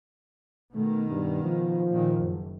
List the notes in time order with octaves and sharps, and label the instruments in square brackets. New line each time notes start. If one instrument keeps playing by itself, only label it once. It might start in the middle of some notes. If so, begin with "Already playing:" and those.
[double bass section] B2 D#3 [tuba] A3
[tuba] G2
F3
[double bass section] A#2 D#3
F#1